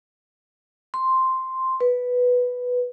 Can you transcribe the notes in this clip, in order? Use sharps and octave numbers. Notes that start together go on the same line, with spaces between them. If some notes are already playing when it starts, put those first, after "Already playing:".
C6
B4